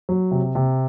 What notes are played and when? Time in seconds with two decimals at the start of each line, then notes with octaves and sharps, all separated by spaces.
0.09 F#3
0.31 C3
0.55 C3